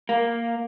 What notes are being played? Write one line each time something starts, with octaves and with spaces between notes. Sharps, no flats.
A#3